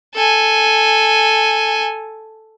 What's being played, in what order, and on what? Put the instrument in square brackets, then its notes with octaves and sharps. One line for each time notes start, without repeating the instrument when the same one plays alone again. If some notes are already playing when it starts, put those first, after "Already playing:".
[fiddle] A4 G#5